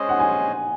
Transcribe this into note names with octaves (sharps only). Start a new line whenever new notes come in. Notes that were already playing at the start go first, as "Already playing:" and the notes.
Already playing: G#3 C#4 G#4 C5 D#5
F#5
G#5